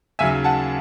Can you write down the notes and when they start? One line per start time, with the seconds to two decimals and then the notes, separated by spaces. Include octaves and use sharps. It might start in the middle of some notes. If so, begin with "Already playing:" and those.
0.19 D#2 C#3 F#3 E5 G#5
0.44 F#5 A5